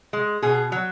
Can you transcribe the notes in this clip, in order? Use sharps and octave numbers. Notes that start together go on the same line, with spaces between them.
G#3
B2 G#4
F#3